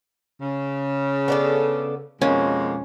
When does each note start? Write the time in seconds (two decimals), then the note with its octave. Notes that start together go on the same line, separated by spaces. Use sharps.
0.42 C#3
1.28 B3 D4 A4
2.22 F2 B2 G#3 A#3 C#4